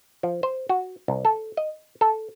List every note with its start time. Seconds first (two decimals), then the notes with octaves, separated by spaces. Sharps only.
0.23 F3
0.43 C5
0.69 F#4
1.08 C2
1.25 A4
1.57 D#5
2.01 A4